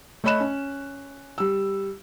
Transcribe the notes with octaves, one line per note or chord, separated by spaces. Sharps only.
A3 C#5 D#5 B5 F#6 E7
C#4
G3 E6